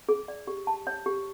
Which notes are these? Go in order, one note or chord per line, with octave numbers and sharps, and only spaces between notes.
G#4
D5
G4
A5
C#5
G4